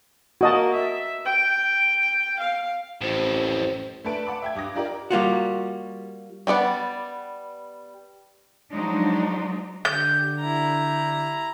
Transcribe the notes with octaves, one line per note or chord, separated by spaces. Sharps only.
A#3 F#4 D#5 A5
E5
G5
F5
A1 F2 A2 C5
A3 D4 B4 A5 D7
F#5 A5 B5 D6
E5 G5 G#6
G2 D6 D#6 A#6
D4 F4 G4 A#4 D5 D#5
G3 A#3 F4 F#4
G3 B3 D5 F#5
F3 F#3 G#3 D4 D#4
D3 G4 G6
E4 A#5